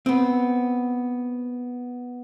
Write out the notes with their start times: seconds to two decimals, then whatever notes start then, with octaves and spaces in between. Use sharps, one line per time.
0.06 B3 C4